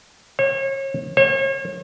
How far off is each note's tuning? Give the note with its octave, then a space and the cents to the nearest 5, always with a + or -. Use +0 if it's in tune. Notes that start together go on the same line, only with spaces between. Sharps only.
C#5 -35
C#5 -40